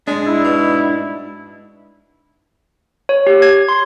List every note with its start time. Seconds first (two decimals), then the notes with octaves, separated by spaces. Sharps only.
0.07 G#2 G#3 D4
0.26 E4
0.44 B2
3.09 C#5
3.27 G4
3.42 G#6
3.68 C6